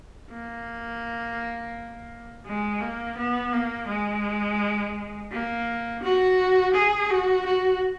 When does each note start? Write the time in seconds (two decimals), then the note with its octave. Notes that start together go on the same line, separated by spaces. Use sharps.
0.31 A#3
2.46 G#3
2.81 A#3
3.18 B3
3.53 A#3
3.88 G#3
5.32 A#3
6.04 F#4
6.75 G#4
7.10 F#4
7.46 F#4